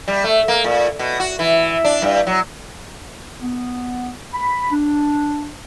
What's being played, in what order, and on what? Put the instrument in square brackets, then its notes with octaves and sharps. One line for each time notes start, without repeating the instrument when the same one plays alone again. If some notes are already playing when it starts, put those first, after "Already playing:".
[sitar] G3
A3
A#3
A#2
B2
F#4
E3
D4
G2
F#3
[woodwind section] B3
B5
D4